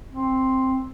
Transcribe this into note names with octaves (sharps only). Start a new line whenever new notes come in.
C4